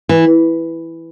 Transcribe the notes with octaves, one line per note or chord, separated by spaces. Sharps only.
E3